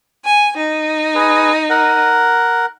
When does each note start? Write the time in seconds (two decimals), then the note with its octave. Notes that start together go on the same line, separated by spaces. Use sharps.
0.25 G#5
0.57 D#4
1.15 G#4 B4
1.70 A#4 F#5